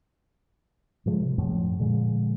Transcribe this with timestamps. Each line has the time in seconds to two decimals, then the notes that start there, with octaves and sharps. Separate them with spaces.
1.06 A2 C#3 F3 G#3
1.22 C3
1.38 F#2 A2 F3
1.79 A#2 D3 F3 G#3